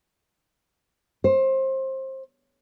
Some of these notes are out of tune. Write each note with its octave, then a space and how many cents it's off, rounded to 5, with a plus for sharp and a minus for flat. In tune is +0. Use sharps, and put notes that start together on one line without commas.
C5 +25